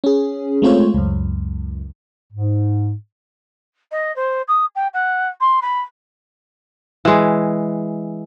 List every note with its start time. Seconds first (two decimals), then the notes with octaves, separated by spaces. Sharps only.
0.04 C#4 G#4
0.62 G#3 A3 C4 F4 C5 C#5
0.94 C#2 F#2
2.33 G#2
3.91 D#5
4.16 C5
4.48 D#6
4.75 G5
4.93 F#5
5.40 C6
5.62 B5
7.05 E3 G#3